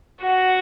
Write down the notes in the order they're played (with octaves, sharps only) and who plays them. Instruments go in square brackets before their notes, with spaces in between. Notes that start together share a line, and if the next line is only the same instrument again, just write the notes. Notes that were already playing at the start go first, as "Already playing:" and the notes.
[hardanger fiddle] F#4